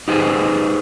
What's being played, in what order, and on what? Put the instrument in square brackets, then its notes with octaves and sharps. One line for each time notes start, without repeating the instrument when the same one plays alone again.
[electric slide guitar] D#4 G4 G#4 B4 C5